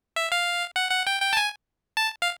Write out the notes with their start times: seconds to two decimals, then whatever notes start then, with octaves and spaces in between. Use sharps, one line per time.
0.16 E5
0.32 F5
0.76 F#5
0.91 F#5
1.07 G5
1.22 G5
1.33 A5
1.37 G#5
1.97 A5
2.22 F5